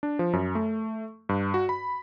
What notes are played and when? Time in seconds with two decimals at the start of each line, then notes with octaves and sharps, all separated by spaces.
0.03 D4
0.19 F3
0.33 F#2
0.55 A3
1.29 G2
1.54 F#4
1.69 B5